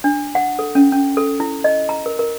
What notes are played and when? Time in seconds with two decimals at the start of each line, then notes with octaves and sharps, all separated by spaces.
0.04 D4
0.35 F#5
0.59 A4
0.75 C#4
0.92 C#4
1.17 A4
1.40 E4
1.64 D#5
1.89 A#5
2.06 A#4
2.19 A#4